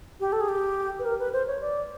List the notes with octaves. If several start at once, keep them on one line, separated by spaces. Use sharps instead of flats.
G4
A4
G#4
G4
B4
A#4
B4
C5
C#5
D5